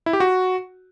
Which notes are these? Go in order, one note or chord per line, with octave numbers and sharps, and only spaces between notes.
E4
G4
F#4